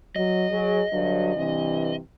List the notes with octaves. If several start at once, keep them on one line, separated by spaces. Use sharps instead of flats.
F#3 D#5
F#3 G#4
G2 D3 F#3
G2 C3 E3